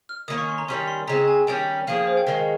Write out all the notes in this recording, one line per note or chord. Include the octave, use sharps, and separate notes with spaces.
F6
D#3 A#3 C#4 D#6
C#6
C6
A#5
D#3 G3 C#4 C6
C6
C#3 G#3 C4 A#5
G#5
D#3 G3 C#4 G4 G5
F3 A#3 C#4 G#4 F5
C5
G5
D#3 G#3 C#4 A#4